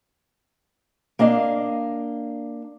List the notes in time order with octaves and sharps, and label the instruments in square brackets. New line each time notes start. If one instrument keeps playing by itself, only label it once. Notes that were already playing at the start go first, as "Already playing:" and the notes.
[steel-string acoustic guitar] A#3 D4 D#5 F5